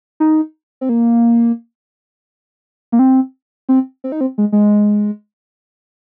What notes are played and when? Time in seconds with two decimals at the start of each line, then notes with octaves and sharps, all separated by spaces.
0.20 D#4
0.81 C4
0.89 A#3
2.92 A#3
2.99 C4
3.69 C4
4.04 C4
4.12 D#4
4.21 C4
4.38 G#3
4.52 G#3